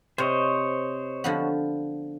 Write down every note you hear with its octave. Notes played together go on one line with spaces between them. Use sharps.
C3 C5 C#5 D#5
D3 F3 B3